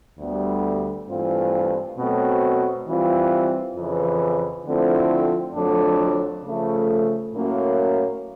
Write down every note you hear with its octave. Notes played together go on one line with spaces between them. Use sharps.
D2 D3 G3 B3
G2 E3 A3 C4 F4
B2 F#3 A3 C4
E3 G3 C4 F4
F2 C#3 E3
D3 F3 A3 C4 E4
F2 D3 F#3 A3 D4
C#3 F3 A3
A2 F#3 A#3 C#4